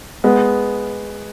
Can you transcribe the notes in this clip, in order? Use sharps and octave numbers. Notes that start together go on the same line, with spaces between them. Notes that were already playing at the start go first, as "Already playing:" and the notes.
G#3 B3